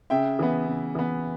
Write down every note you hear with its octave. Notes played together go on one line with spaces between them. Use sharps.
C#3 E5 G5
E3 B3
C#3
E3 B3